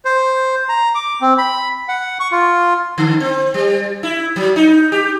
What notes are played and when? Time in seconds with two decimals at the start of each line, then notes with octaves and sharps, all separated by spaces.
0.05 C5
0.69 A#5
0.95 D6
1.21 C4
1.38 B5
1.88 F#5
2.20 C#6
2.32 F4
2.98 D3
3.20 C4
3.54 G3
4.03 E4
4.36 F#3
4.56 D#4
4.92 G4